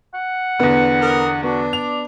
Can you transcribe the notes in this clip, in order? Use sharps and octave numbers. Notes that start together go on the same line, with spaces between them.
F#5
E2 D3 B3
A#4 D#6
B3 D4 F#4
D5 F7